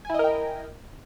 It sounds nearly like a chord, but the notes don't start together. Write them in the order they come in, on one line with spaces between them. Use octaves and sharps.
G#5 E4 D#5 A#4 G5